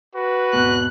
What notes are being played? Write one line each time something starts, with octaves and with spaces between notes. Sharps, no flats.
F#4 B4
G#1 E2 B2 F#6